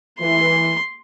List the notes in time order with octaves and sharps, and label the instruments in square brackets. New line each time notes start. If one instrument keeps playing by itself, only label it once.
[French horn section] E3 [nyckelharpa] C6